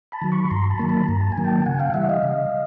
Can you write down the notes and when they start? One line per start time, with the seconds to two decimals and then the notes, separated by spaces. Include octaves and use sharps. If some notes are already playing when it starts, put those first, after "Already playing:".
0.12 A5 B5
0.22 D#3 F#3
0.32 B5 C#6
0.50 G2 A#5 C6
0.70 A5 B5
0.79 D#3 F#3 A#3
0.89 A5 B5
1.08 G2 A#5
1.21 A5
1.32 G#5
1.37 D#3 F#3 A#3
1.44 G5 A5
1.66 C#3 F#5 G#5
1.80 F5 G5
1.94 E3 G3 E5 F#5
2.09 D#5 F5
2.23 C#3